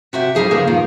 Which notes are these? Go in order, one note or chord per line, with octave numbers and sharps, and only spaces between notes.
C3 F#4 G4 E5
G3 D#4 G#4 C5
C#3 F3 A#3 B3 G#4 D5
G2 A#2 D#3